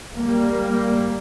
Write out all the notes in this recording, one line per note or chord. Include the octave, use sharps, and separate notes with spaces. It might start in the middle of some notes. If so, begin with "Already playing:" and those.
G3 A#3